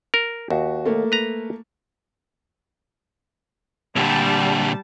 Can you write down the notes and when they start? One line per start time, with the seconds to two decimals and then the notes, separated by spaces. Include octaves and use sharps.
0.14 A#4
0.50 D#2 F#4
0.86 A3 A#3
1.12 B4 A#5
3.96 A#2 D3 G3 A5